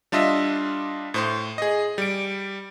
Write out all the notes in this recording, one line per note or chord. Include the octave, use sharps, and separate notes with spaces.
G3 D4 F4 D#5 E5
A2 C5 C6
G#4 D#5
G3 D7